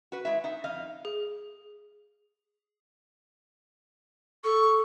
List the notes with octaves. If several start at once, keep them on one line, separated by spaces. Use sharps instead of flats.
F#4 B4
G#3 E4 E5
D#4 E5
F2 D#5 F5
G#4
A4 C#6